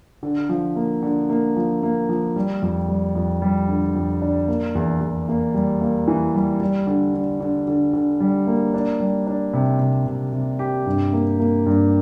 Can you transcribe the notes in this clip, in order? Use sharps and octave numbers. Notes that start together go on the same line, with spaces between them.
D3
F3
A#3
D3
A#3
F3
A#3
F3
G3
F2
G3
F2
G3
D3
F2
D4
A#3
E2
E2
A#3
G3
A#3
E3
G3
G3
D3
D3
D3
D3
D3
G3
A#3
D4
G3
D4
C3
C3
C3
C3
G4
G2
A#3
A#3
G2